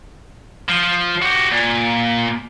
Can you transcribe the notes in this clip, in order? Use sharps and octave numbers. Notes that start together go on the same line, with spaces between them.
F3
F#4 G4
A#2